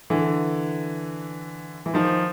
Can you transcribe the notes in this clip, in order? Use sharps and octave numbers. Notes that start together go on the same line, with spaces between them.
D3 E3
E3
D#3 F3